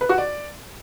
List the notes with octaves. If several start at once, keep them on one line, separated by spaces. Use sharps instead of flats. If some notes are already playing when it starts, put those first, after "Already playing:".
B4
F#4
D5